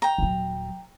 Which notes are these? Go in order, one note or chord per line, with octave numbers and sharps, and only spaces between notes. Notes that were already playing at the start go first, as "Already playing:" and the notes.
G5 A#5
D#1 F#3